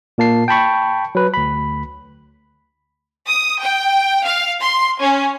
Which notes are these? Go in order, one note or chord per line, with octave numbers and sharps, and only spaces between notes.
A#2 A#3 A5 C7
G5 A5 B5 C#6
F#3 B4
D2 B5
D#6
G5
F5
C6
C#4